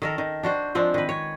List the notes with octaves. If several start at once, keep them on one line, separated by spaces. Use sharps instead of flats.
D#3 A4 A#4
D#3
D4 F#4 C5
F3 G#3 C4 D4
D#3 B4
C#5